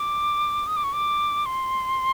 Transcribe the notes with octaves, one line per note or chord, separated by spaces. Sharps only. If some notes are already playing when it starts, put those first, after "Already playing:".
Already playing: D6
D#6
D6
C#6
D6
C6